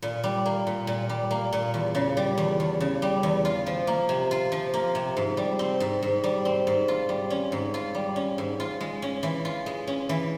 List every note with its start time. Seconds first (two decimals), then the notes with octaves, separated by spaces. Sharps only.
0.02 A#2
0.24 G3
0.46 A#3
0.67 A#2
0.87 A#2
1.09 G3
1.31 A#3
1.53 A#2
1.74 E2
1.95 C#3
2.17 G3
2.38 E2
2.60 E2
2.80 C#3
3.02 G3
3.23 E2
3.45 F4
3.66 F3
3.87 A#3
4.09 C3
4.31 F4
4.52 F3
4.74 A#3
4.95 C3
5.17 G#2
5.37 G3
5.59 C4
5.80 G#2
6.03 G#2
6.24 G3
6.45 C4
6.67 G#2
6.88 F4
7.09 G3
7.30 C#4
7.52 G#2
7.74 F4
7.95 G3
8.16 C#4
8.38 G#2
8.60 F4
8.81 G#3
9.02 C#4
9.23 E3
9.45 F4
9.66 G#3
9.87 C#4
10.09 E3